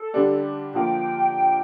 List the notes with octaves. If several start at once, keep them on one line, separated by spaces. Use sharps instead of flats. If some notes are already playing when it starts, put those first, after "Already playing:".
Already playing: A4
D3 G3 D4 G4
D3 F3 A#3 G5